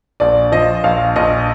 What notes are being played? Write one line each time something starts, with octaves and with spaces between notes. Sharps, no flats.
A#1 D5
F3 D#5
A#1 F5
A#1 D#5